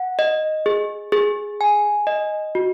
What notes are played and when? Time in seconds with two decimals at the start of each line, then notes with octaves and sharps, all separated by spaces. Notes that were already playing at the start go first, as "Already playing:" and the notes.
Already playing: F#5
0.19 D#5
0.66 G#4
1.12 G#4
1.61 G#5
2.07 D#5
2.55 F#4